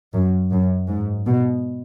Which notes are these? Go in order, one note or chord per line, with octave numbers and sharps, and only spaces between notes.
F#2
F#2
G#2
B2